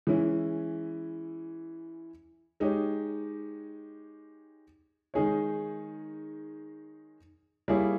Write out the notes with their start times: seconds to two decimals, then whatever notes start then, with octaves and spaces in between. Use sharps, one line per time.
0.07 E3 G#3 C#4 E4
2.60 G#3 D#4 G4 C#5
5.14 D#3 G#3 D#4 G#4 C#5
7.68 G3 A#3 E4 G#4 C#5